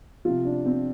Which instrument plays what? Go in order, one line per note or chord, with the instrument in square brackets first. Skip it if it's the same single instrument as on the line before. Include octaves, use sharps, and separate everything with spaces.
[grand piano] C3 F3 F4
D4
C4